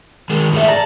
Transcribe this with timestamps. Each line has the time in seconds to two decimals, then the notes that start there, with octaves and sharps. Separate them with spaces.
0.30 D#3 G#3 G#4
0.53 A2 G#4 E5
0.68 D5 A5 A#5